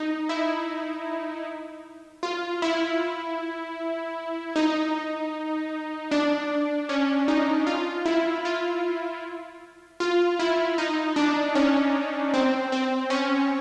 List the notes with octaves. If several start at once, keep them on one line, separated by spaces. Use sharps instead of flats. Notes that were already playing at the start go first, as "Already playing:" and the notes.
Already playing: D#4
E4
F4
E4
D#4
D4
C#4
D#4
F4
E4
F4
F4
E4
D#4
D4
C#4
C4
C4
C#4